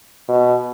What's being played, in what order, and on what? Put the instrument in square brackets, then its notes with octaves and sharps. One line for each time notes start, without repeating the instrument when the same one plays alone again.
[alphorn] B2